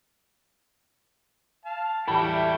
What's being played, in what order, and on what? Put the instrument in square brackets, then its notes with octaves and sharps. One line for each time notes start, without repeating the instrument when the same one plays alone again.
[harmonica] F5 A5
[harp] E2 A2 [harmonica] G3 G5 [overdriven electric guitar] E4 F#4 [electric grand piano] A5 B5